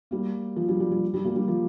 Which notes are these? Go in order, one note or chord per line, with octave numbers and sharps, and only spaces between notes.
G3 A#3
F3
G3
G3
G3
G3
G3 A#3
G3
F3